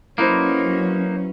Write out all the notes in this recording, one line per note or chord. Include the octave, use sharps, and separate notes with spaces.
F#3 A#3 C#4 D#4 E4 B4 C5